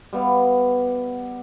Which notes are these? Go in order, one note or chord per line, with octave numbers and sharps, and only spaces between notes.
G3 B3 F5